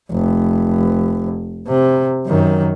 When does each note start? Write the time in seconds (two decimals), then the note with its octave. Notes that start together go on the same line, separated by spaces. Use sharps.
0.11 F1
1.68 C3
2.26 F#2 D#3